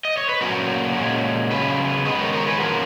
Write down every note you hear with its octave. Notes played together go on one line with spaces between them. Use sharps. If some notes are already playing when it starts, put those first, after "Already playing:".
D#5
C#5
B4
A#2 F#3 A#3 C#4 F#4 A#4
A#2 G#3 C#4
C#3 F#3 C#4 G#4 B4
D#3 G#3 B3 B4 D#5
A#4 C#5
A#4 C#5
G#4 B4
F3 A#3 C#4 F#4 A#4